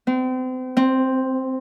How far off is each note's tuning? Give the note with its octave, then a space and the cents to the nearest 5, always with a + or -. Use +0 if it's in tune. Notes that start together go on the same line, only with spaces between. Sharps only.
C4 -35
C4 +0